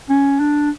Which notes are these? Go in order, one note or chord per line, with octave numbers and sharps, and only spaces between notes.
C#4
D4